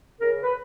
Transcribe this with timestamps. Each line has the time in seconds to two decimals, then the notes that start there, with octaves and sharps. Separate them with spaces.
0.21 C#3 A#4
0.43 B4